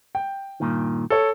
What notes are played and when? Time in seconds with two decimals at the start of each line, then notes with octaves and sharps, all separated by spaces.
0.15 G5
0.60 G2 A#2 D#3
1.10 A4 C#5